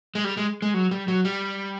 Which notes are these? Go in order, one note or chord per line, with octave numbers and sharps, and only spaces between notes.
G#3
G3
G#3
G#3
F#3
G3
F#3
G3